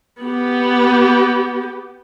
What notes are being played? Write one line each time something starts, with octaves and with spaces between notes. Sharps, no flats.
B3 G4